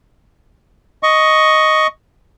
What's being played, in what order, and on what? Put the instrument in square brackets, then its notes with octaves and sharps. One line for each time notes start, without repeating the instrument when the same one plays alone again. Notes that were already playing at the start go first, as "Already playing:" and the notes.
[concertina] D#5 C#6